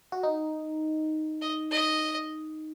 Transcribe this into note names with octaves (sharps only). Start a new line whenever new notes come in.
F#4
D#4
D#5
D#5